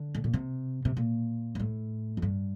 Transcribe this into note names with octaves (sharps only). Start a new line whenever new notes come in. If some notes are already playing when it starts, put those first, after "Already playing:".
Already playing: D3
A2
A#2
C3
C3
A#2
G2
A2
F2
G2